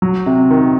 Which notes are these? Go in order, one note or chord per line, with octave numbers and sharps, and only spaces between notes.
F#3
C3
D#3